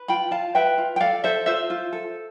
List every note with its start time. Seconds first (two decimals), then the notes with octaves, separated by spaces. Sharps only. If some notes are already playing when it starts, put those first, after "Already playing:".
Already playing: B4
0.08 F4 G5 B5
0.31 F4 F5 A5
0.55 B4 E5 G5
0.78 F4
0.96 G5
1.01 A4 D5 F5
1.24 A4 C5 E5
1.46 F4 C5 E5
1.70 F4
1.93 A4